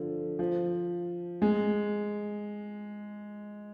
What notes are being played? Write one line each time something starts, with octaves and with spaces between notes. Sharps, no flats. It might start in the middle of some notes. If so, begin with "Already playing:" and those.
Already playing: D3 F3
F3
G#3